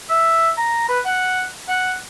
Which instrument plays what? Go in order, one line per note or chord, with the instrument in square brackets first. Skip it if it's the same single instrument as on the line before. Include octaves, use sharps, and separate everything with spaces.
[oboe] E5
A#5
B4
F#5
F#5